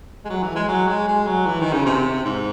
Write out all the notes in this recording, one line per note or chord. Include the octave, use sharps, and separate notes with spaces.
G#3
F#3
E3
G#3
F#3
G#3
G#3
F#3
E3
D#3
C#3
C3
G#2